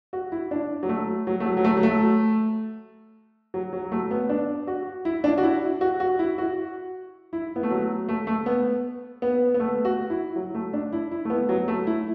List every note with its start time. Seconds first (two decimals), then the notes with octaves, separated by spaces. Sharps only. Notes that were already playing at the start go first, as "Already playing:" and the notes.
0.13 F#4
0.32 E4
0.51 D4
0.83 F#3
0.89 A3
1.27 F#3
1.40 A3
1.46 F#3
1.57 F#3
1.65 A3
1.77 F#3
1.83 A3
3.54 F#3
3.73 F#3
3.84 F#3
3.92 A3
4.11 B3
4.29 D4
4.67 F#4
5.05 E4
5.24 D4
5.38 F#4
5.43 E4
5.81 F#4
6.00 F#4
6.19 E4
6.38 F#4
7.33 E4
7.56 B3
7.63 A3
7.71 F#3
8.08 A3
8.27 A3
8.46 B3
9.22 B3
9.54 B3
9.60 A3
9.85 F#4
10.10 E4
10.36 F#3
10.55 A3
10.73 D4
10.93 E4
11.11 E4
11.25 A3
11.30 B3
11.49 F#3
11.68 A3
11.87 E4